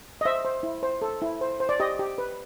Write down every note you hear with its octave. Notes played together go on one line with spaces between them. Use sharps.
D#5
C5 E5
C5
E4
C5
A4
E4
C5
C5
D5
G4 D#5
G4
B4